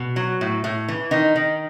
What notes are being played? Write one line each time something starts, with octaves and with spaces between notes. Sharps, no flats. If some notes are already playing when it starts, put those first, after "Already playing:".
Already playing: B2
F#3
A2
A2
E3
D#3 D#4
D#3